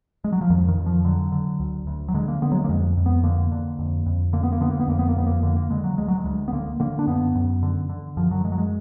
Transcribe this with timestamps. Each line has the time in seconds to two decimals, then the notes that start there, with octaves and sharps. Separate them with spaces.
0.24 G#3
0.33 F#3
0.41 F3
0.50 F2 D#3
0.68 D#3
0.78 F2
0.86 F3
1.05 D3 F#3
1.32 D3
1.60 D2
1.87 D2
2.08 F#3
2.14 D3 G#3
2.28 A#3
2.42 D3 B3
2.52 F#3
2.56 G#3
2.64 A#3
2.69 F2 G#3
2.97 F2
3.06 B3
3.24 D3 A#3
3.52 D3
3.79 F2
4.06 F2
4.33 D3 A#3
4.43 B3
4.52 A#3
4.61 D3 B3
4.71 A#3
4.80 B3
4.88 F2 A#3
4.99 B3
5.09 A#3
5.16 F2 B3
5.27 A#3
5.43 D3 A#3
5.56 A#3
5.70 D3 G#3
5.84 F#3
5.98 D2 G#3
6.08 F#3
6.19 G#3
6.25 D2
6.48 B3
6.53 D3 A#3
6.80 D3 A#3
6.99 D4
7.07 F#2 B3
7.35 F#2
7.63 D3
7.89 D3
8.17 F#2 F3
8.31 F#3
8.44 F#2 G#3
8.52 F#3
8.58 G#3